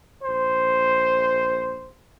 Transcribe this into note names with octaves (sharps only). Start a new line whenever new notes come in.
A#1 C5